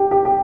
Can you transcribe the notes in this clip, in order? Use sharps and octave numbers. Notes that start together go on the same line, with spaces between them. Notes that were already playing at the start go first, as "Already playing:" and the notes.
Already playing: G4
G4
G4